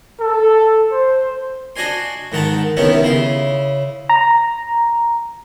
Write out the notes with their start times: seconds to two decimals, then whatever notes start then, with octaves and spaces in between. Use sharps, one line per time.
0.21 A4
0.92 C5
1.76 D4 F#4 D#5 G#5 C6
2.32 G#2 D#3 F#5 A5
2.77 C3 D#3 B3 C#4 E4
3.04 C#3 E4 C6
4.09 A#5